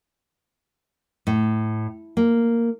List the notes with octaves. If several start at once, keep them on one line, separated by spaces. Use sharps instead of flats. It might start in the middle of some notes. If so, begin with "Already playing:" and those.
A2
A#3